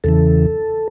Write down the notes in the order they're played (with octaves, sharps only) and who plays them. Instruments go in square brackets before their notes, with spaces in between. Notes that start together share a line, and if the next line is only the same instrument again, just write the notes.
[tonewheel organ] E2 C#3 E3 A4